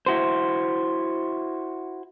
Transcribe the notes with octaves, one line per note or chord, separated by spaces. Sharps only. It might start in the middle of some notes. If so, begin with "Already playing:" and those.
E4 F#4 C5